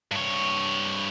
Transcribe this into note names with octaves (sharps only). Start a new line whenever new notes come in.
G2 C#5